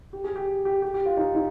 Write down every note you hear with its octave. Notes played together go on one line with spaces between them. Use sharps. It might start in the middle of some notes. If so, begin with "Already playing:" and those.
G4
G#4
G4
G4
G4
G4
F4
D#4
D#4